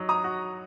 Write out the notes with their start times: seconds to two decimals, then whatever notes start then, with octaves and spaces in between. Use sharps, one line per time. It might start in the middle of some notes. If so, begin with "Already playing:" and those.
Already playing: F#3 D#4
0.09 A#5 D#6
0.24 F#4